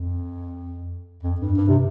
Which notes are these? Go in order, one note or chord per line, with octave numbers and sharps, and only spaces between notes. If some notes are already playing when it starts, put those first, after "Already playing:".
Already playing: F2
F2
G2
G2
C3